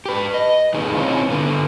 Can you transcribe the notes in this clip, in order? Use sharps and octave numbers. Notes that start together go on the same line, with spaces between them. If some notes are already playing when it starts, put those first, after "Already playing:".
G4 B4
D#5
E2 D#3 D#4 G#4 B4
C4 C#4 E4 F4
D3 B3